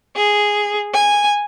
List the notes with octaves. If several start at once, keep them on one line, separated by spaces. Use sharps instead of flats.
G#4
G#5